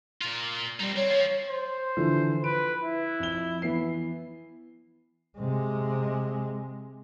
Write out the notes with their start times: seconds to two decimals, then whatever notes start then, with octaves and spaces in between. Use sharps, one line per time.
0.22 A#2 F4
0.80 G3 C4 D#4
0.96 C4 C#5
1.10 F3
1.49 C5
1.97 D3 E3 F3
2.44 B4 D7
2.83 E4
3.20 F2 G7
3.62 E3 B3 C7
5.39 C3 G#3